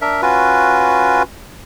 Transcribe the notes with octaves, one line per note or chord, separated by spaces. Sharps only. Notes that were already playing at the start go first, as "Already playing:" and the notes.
D4 A#4 E5
C#4 F4 F#4 B4